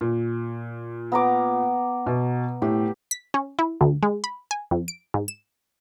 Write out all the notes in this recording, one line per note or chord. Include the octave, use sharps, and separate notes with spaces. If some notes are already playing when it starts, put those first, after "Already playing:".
A#2
B3 A#5 D6
B2
A2 G4
B6
C#4
E4
D2
G#3
B5
G#5
F2
D7
G#2
E7